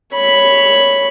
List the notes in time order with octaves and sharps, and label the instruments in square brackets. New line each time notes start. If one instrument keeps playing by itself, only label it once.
[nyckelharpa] C#5 B5